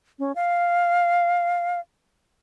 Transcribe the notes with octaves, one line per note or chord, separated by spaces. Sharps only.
C#4
F5